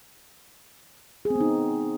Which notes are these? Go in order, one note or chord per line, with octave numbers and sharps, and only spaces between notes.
G#4
C4
B3
D#4